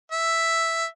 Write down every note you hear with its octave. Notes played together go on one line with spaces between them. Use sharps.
E5